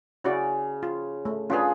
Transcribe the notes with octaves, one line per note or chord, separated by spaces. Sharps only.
C#3 E4 F#4 D5
F4
A3
C#4 D4 F4 G#4 B4